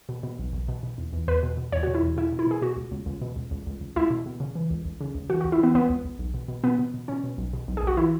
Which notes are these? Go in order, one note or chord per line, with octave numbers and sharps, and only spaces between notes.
B2
B2
B1
B1
B2
B2
E2
E2
E2 B4
B2
B2
E2 C#5
B2 F#4
E4
E2
B2 E4
B2
E4
B2 G#4
B2 F#4
C#2
C#2
C#2
B2
C#2
C#2
C#2
C#2
C#2 E4
B2
B2
C#3
E3
C#2
C#2
C#3
C#2
E3 F#4
F#4
C#2
E4
E3 B3
C#2 B3
C#2
C#2
B1
B2
B2
B2 B3
B2
B2
B2 C#4
B2
B1
B2
B1
G#4
B1 F#4
E3 E4